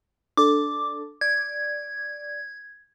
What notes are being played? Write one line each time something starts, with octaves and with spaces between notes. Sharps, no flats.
D4 A4 D6
D5 G#6